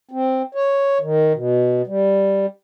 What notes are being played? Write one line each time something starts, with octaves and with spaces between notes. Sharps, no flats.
C4
C#5
D#3
B2
G3